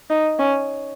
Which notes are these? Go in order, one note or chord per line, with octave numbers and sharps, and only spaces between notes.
D#4
C#4